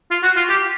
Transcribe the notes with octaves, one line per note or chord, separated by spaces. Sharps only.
F4
F#4
F4
G4